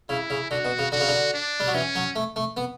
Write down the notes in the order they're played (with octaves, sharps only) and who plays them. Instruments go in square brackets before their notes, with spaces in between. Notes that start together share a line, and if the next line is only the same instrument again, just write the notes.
[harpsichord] C#3 [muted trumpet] E4
[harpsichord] C#3
[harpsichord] D3 [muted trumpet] F#4
[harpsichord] B2
C#3
[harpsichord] D3 [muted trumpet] F#4
[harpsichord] C#3
D3
[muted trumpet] D4
[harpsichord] G3
F#3
[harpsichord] E3 [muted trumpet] C#4
[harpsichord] F#3
A3
A3
B3